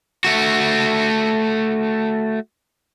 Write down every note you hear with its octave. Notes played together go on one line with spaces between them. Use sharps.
A3 F#4